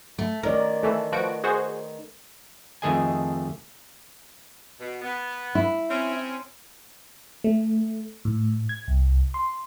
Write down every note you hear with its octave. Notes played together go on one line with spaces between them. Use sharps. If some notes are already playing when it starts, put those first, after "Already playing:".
A3
D#3 A3 A#4 C#5 D5
E3 A3 A4
F3 F#4 B4 D7
F#4 G#4 C5
F2 D#3 A3 G#4 D#5 G#5
B2
B3
E4
C4 C#4
A3
A2
G#6
C2
C6